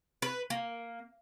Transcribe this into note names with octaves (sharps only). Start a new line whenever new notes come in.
B4
A#3